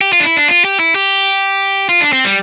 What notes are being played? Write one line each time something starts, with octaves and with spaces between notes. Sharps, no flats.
G4
F4
D4
E4
D4
F4
G4
E4
G4
F4
D4
C4
G3